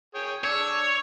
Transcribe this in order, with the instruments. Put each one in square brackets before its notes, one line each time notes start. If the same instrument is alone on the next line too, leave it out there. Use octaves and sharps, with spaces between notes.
[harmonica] G#4 C#5 G5
[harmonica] D4 E6 [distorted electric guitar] C#5